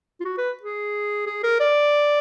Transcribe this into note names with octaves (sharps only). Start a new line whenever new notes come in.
F4
F#4
B4
G#4
G#4
A#4
D5